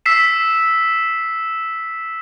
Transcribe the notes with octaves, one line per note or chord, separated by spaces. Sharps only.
E6 B6 C7 E7